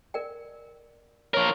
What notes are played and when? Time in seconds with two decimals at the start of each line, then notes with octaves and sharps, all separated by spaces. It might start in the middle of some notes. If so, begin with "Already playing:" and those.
0.14 A#4 D5 G5
1.34 F3 A#4 C#5 C#6